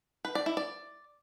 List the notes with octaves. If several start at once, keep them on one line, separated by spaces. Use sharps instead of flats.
B4
D5
E4
D5